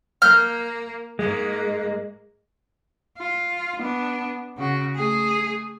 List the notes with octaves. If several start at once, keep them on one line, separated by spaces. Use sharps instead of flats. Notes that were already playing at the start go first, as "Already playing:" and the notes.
A#3 F6 G6
G#2 G#3 A#3
F4
B3 D4
C#3 F#4
A3 G#4